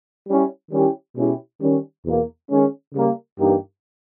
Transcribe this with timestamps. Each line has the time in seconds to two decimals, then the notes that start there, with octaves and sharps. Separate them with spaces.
0.28 G3 C#4 E4
0.71 D#3 G3 C#4 E4 G4
1.16 B2 G#3 C#4 E4 G4
1.61 D#3 G3 C#4
2.05 E2 B2 A#3
2.49 D#3 G#3 C#4
2.94 C#3 G3 A#3
3.39 G2 E3 A#3 D#4 G4